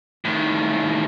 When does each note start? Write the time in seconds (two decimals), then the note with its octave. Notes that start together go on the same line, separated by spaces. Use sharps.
0.25 A2 D#3